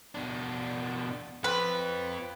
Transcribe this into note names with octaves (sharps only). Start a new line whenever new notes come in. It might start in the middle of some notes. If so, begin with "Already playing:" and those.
B2 D4
C4 F4 B4